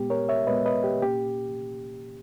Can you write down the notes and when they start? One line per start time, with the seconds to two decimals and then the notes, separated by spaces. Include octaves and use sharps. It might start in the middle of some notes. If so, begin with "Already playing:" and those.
Already playing: A#2 G#3 B3 G4
0.10 A#4 C#5
0.29 C#5 E5
0.47 A#2 G#3 B3 B4 D#5
0.66 B4 D#5
0.84 G4
1.02 A#2 A#3 C#4 G4